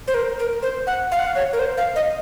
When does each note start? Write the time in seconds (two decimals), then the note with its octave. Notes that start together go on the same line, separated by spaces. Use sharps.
0.08 C5
0.14 A#4
0.39 A#4
0.62 C5
0.87 F#5
1.12 F5
1.19 F#5
1.26 F5
1.35 C#5
1.53 A#4
1.59 C5
1.77 F5
1.96 D#5